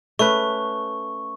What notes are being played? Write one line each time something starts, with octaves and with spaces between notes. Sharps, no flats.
A3 C#4 B4 C#6